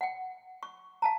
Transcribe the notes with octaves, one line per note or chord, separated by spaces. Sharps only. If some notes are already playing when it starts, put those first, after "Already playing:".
F#5 G5
C#6
F5 A5 A#5